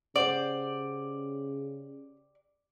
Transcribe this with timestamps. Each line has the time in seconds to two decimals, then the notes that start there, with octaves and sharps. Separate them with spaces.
0.16 C#3 G4 C5 D5 F#5